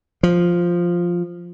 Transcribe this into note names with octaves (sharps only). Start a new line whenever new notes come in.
F3